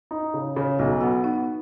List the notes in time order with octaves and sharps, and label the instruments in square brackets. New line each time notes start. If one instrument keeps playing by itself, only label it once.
[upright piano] D#4
C#3
C#3
[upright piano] B1 [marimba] F#4
[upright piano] B3 [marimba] F#4
[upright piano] B3 [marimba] D#4